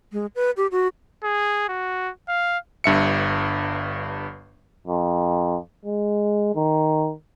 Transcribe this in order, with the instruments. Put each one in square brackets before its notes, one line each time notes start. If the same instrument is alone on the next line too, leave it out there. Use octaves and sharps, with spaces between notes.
[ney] G#3
B4
G4
F#4
[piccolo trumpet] G#4
F#4
F5
[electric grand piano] G1 G2 E5 C#7
[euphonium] F2
G#3
D#3